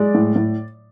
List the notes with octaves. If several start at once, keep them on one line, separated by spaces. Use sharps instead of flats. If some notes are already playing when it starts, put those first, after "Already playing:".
Already playing: G#3 D5
A2
A2